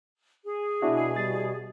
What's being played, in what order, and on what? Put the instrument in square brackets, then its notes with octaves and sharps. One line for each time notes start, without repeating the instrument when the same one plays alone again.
[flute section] G#4
[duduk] B2 [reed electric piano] B3 D4 F#4 [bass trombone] E4
[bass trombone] G3 [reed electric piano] A6